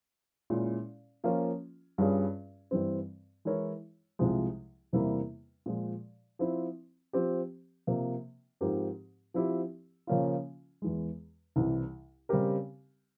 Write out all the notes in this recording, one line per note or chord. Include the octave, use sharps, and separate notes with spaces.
A#2 G#3 C#4 E4
F3 A#3 C#4 F4
G2 G3 C#4 F4 G#4
G2 E3 G3 C4
E3 G#3 E4 A#4 C#5
C2 C3 F3 G#3
E2 C3 G3 A#3 E4
A#2 F3 G#3
F3 C4 E4
F3 C4 G4
C3 F3 A#3
G#2 F3 C4 G4 A#4
F3 C4 E4 G4
C#3 F3 A#3 C#4 F4
E2 E3 G#3
C2 C3 E3
C#3 G3 C4 G4 A#4